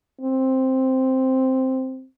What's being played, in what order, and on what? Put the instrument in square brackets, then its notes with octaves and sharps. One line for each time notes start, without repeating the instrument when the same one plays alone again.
[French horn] C4